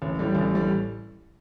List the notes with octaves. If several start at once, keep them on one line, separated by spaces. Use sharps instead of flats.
A1
A2 G3
A1
A2 G3